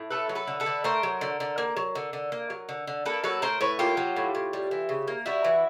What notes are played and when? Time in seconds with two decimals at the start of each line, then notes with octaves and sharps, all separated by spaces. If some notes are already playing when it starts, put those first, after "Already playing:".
Already playing: A2
0.11 A3 A4 B4
0.29 F#3
0.35 A4 B4
0.47 D3
0.60 A4 B4
0.66 D3
0.84 A3 A#4 C5
1.03 F#3
1.21 D3
1.40 D3
1.58 A#3
1.77 F#3
1.95 D3
2.13 D3
2.32 A#3
2.50 F#3
2.69 D3
2.87 D3
3.05 A#3 A4 B4
3.24 F#3 A4 B4
3.42 A2 A#4 C5
3.61 A2 B4 C#5
3.79 A#3 F4 G4
3.97 F#3
4.16 A2
4.35 A2
4.53 G3
4.71 E3
4.89 C#3
5.07 A#3
5.26 G3 E4 F#4
5.44 E3